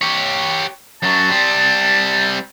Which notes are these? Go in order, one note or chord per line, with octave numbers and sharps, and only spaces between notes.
G4 C#5
F#2 F#3 A5
G3 C4